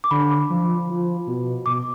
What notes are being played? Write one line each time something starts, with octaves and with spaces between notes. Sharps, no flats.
D6
D3 B5
F3
F3
B2
B2 D6